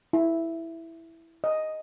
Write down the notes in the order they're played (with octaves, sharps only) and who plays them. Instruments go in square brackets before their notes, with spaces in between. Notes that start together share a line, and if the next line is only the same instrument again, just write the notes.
[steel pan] E4
D#5